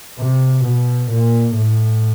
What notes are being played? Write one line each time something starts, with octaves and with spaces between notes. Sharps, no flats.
C3
B2
A#2
A2